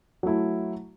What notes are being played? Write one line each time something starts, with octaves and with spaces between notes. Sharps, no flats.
F#3 A3 E4